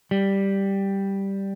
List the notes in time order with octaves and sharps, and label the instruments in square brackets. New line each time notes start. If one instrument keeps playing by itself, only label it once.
[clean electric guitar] G3